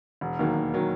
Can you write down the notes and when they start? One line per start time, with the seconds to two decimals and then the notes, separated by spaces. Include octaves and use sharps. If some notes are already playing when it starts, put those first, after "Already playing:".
0.21 E1
0.39 D#2 D#3 F#3 A#3
0.56 E1
0.74 D#3 F#3 A#3